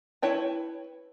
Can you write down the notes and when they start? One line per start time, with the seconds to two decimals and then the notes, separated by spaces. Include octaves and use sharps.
0.22 E4 B4 C#5 G5 A5